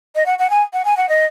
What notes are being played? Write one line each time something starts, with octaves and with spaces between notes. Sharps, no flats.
D#5
F#5
F#5
G#5
F#5
G#5
F#5
D#5